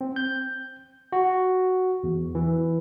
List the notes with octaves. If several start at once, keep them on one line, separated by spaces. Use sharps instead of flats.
C4
G6
F#4
E2
E3